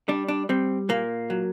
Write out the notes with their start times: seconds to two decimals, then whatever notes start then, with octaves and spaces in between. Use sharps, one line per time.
0.08 G3 D4
0.28 D4
0.49 G3 C4
0.89 A#2 A#3
1.30 F#3